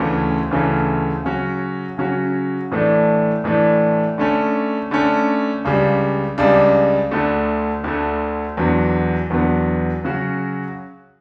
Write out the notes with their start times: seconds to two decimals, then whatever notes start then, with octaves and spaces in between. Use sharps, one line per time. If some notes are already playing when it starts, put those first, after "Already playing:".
Already playing: D2 C#3 E3 A3 C#4
0.51 D2 C#3 E3 A3 C#4
1.24 C#3 F#3 C#4 F#4
1.98 C#3 F#3 C#4 F#4
2.72 A2 E3 A3 D4
3.44 A2 E3 A3 D4
4.18 D3 A3 C#4
4.91 D3 A3 C#4
5.65 C#2 C#3 G3 D4
6.38 C#2 C#3 G3 D4
7.11 D2 D3 A3
7.84 D2 D3 A3
8.57 E2 D3 F#3 B3
9.30 E2 D3 F#3 B3
10.04 C#3 F#3 C#4 F#4